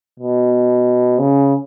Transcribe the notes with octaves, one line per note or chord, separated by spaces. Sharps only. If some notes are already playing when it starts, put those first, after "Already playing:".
B2
C#3